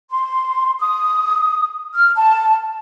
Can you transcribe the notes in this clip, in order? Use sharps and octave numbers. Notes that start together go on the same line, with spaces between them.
C6
D#6
F6
A5